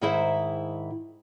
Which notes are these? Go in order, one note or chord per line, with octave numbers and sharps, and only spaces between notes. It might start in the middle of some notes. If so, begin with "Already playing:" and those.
G#2 D#3 E4 G#4 C5 E5